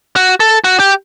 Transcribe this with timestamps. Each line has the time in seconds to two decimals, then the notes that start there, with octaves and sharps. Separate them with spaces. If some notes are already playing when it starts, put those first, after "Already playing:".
0.16 F#4
0.40 A4
0.64 F#4
0.80 G4